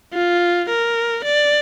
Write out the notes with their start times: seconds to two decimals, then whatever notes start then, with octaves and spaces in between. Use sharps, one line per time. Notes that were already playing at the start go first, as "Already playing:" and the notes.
0.13 F4
0.69 A#4
1.25 D5